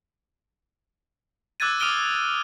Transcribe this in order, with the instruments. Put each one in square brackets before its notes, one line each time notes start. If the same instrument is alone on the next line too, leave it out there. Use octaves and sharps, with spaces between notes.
[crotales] D6 E6 F#6 G#6 A6 D#7
D6 D#6 F6 D7 D#7 G7